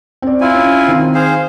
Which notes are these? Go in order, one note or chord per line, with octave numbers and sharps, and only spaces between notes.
C4 D5
E4 F4 G#5
C#4
D#3 C4
G#4 C5 F5